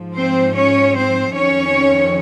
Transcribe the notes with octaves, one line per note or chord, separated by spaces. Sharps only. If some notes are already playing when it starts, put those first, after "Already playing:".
Already playing: G#2 F3
C4 C5
C#4 C#5
C4 C5
F2 D#3 C#4 C#5